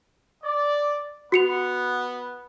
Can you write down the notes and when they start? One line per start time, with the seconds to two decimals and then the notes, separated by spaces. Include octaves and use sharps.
0.43 D5
1.32 B3 F#4 C#7 F7